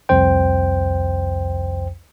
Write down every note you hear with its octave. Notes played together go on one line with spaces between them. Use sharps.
C2 F2 C5 G5